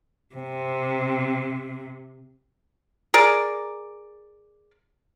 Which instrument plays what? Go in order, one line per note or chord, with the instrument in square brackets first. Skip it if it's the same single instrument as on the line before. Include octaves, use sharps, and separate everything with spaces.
[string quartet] C3 [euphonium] C4
[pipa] G#4 A#4 D5